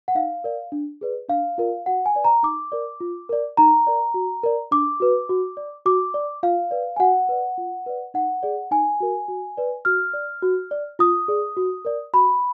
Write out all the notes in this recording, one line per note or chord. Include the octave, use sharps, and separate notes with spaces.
F#5
D#4 F5
A#4 D5
D4
G#4 B4 D5
D4 F5
F4 A#4 D5
F#4 F#5
G#5
B4 D5
A#5
D#4 D6
A#4 D5
F4
A#4 D5
D#4 A#5
A#4 D5
F#4
A#4 D5
D4 D6
F#4 B4
F#4
D5
F#4 D6
D5
F4 F5
B4 D5
G#5
F#4 F#5
B4 D5
F4
B4 D5
D#4 F#5
G#4 D5
D#4 G#5
F#4 A#4
F#4
B4 D5
F#4 F6
D5
F#4
D5
F4 D#6
G#4 D5
F#4
A#4 D5
F#4 B5